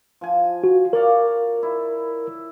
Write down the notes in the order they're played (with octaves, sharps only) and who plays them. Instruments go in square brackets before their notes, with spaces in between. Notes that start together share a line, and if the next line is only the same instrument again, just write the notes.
[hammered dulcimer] F3 G#5
[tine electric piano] F#4
[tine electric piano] A#4 [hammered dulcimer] C#5 D5 F5
[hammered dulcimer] E4